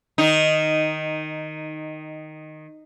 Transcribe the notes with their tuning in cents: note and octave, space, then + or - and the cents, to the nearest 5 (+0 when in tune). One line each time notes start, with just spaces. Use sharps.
D#3 -10 D#4 +0